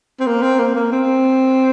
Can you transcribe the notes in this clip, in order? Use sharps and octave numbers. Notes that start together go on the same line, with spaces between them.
C4
A#3
C4
A#3
A#3
C4